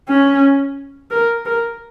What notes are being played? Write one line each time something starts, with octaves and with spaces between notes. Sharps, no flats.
C#4
A#4
A#4